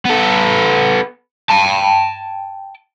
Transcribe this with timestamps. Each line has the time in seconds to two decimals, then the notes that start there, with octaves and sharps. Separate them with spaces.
0.05 B3 A4
1.49 G5 A5